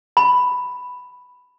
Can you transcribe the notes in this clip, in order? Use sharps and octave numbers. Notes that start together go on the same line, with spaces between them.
B5